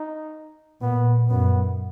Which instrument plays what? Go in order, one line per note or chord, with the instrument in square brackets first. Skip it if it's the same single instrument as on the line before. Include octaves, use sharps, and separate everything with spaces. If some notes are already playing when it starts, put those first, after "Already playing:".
Already playing: [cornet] D#4
[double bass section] A#2 [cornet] B3
[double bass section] F#2 [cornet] B3